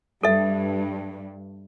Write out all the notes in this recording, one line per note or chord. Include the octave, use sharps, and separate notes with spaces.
G2 A4 E5